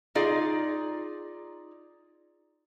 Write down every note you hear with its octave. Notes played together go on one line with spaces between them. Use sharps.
D#4 F4 G#4 D5